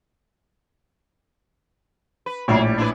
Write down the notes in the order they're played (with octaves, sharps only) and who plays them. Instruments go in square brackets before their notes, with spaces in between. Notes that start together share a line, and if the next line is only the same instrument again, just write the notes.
[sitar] B4
[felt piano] A#1 A2 C#5 [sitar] F#3 E4
[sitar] G3
D4 E4 B4